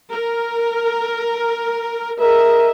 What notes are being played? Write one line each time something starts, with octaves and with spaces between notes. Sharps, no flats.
A#4
G#4 A#4 D#5 E5